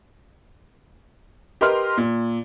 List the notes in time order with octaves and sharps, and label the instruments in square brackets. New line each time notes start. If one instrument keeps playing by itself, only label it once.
[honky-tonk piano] G4 A#4 B4 D#5 C6 F6
A#2